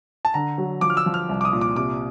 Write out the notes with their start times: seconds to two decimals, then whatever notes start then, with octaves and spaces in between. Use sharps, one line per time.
0.25 A5
0.34 D3 A#5
0.58 F#3
0.81 F3 D6
0.90 F6
0.97 E6
1.06 F3
1.14 F6
1.29 C2
1.41 D6
1.45 D#6
1.53 A#2
1.61 D6
1.76 C3 D6